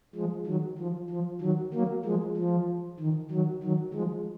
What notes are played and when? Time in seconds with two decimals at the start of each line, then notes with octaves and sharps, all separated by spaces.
0.15 F3 G#3
0.46 D#3 F#3
0.78 F3
1.10 F3
1.41 D#3 F#3
1.73 F#3 A#3
2.05 F3 G#3
2.37 F3
3.00 D#3
3.31 D#3 F#3
3.63 D#3 F#3
3.94 F3 G#3